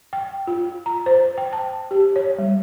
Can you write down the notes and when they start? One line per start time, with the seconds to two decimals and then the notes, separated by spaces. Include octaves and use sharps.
0.13 G5
0.47 F4
0.86 A#5
1.06 C5
1.38 G5
1.53 A5
1.91 G4
2.16 C#5
2.38 G3